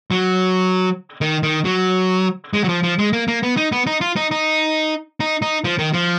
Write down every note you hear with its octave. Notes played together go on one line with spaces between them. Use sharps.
F#3
D#3
D#3
F#3
G#3
F#3
F3
F3
G#3
A#3
A#3
B3
D#4
B3
D#4
F4
D#4
D#4
D#4
D#4
F3
D#3
F3